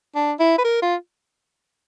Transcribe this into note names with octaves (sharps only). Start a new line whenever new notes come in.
D4
E4
B4
A#4
F4